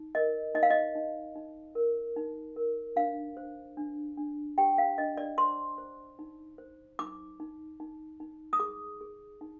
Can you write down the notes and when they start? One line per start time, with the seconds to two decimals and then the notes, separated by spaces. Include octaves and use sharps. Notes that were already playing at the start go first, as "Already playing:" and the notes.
Already playing: D#4
0.15 A#4 D#5
0.55 D#4 D#5
0.63 F5
0.70 D#5
0.95 D#4
1.35 D#4
1.75 A#4
2.16 D#4
2.56 A#4
2.96 D4 F5
3.37 C5
3.77 D4
4.17 D4
4.58 G4 G5
4.78 F5
4.98 D4 D#5
5.17 D5
5.38 C5 C6
5.78 C5
6.19 D#4
6.58 C5
6.99 D#4 D6
7.40 D#4
7.80 D#4
8.20 D#4
8.53 D#6
8.59 G#4 D6
9.01 G#4
9.41 D#4